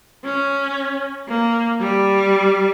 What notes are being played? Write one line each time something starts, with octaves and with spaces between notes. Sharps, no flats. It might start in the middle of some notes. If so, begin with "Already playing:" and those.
C#4
A#3
G3